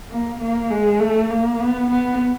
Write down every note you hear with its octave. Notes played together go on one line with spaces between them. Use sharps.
A#3
A#3
G#3
A3
A#3
B3
B3